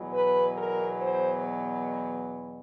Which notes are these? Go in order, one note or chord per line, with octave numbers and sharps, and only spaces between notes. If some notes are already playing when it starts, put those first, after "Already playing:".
Already playing: E2 B2 F#3
B4
A#4
C5